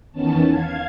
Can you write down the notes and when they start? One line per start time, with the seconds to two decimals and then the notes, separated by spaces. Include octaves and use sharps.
0.12 E2 D#3 B3 C#4 A5
0.49 F5 G#6